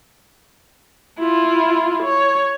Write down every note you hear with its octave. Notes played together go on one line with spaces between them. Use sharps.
E4 F4
C#5